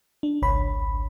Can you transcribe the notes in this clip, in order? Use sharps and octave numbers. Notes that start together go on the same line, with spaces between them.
D4
G#1 C#2 C#5 B5